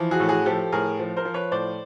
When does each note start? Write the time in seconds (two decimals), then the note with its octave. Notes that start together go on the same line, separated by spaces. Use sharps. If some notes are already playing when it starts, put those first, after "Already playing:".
Already playing: E3 F3
0.11 F#4 G#4
0.20 A2 A4
0.29 F#4 G#4
0.46 F3 G4 A4
0.72 A2 G#4 A#4
0.99 F3
1.17 A#4 C5
1.25 F3
1.34 B4 C#5
1.52 A2 C5 D5